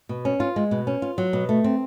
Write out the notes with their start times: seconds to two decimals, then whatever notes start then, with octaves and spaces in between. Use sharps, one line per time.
0.09 B2
0.25 C#4
0.40 F4
0.56 G#3
0.71 B2
0.87 C#4
1.02 F4
1.18 F#3
1.33 B2
1.49 A3
1.64 C4